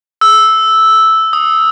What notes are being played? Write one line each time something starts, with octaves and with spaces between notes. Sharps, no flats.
E6
D#6